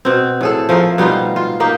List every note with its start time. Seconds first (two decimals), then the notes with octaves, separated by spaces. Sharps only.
0.05 B2 C4
0.41 A2 G#4 A4
0.69 F3 A3 G#4 A#4
0.98 B2 G3 D#4 F4
1.36 F4
1.60 A#3 D#4 G4